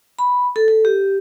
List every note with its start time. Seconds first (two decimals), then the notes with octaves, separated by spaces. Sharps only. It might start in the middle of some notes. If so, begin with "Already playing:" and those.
0.19 B5
0.56 A4
0.68 A4
0.85 G4